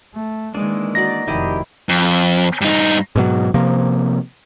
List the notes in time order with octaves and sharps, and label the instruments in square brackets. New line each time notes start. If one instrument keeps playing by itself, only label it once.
[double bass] A3
[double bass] D#3 G#3 [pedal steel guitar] E3 A#3 D4
[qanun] D#4 F#4 D5 [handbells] A#6
[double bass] F1 [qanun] D#3 E4 [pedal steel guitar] G4 D5 D#5
[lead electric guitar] F2
G2 D#4
[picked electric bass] G#2 B2 F#3
C3 F3 A#3